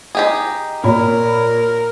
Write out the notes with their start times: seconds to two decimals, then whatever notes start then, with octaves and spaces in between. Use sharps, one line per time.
0.15 D#4 G4 G#4
0.84 A#2 A#4 C#5 B5